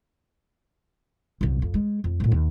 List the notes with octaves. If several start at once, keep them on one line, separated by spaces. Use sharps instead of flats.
C2 F#2
F2
G#3
F2
A1 A2
D#2